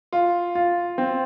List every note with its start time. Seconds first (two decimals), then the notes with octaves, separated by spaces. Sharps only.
0.12 F4
0.55 F4
0.98 C4